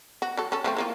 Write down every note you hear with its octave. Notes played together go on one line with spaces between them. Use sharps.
F#4
F#3 A4
C#4 A4
F3 A3 C4
E3 A#3 F4